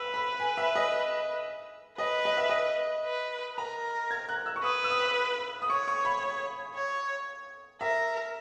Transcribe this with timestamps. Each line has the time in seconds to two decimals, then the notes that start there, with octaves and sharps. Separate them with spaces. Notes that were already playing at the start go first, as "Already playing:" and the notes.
Already playing: B4 E6
0.14 B5
0.40 G#5
0.57 E5
0.75 D#5
1.98 B4 D#5
2.25 D#5
2.37 E5
2.49 D#5
3.05 B4
3.57 A#4 A#5
4.11 G#6
4.29 F#6
4.46 E6
4.56 C#6
4.63 B4 D#6
4.84 E6
4.90 D#6
5.62 D#6
5.69 C#5 C#6
5.87 C#6
6.05 B5
6.75 C#5
7.81 A#4 E5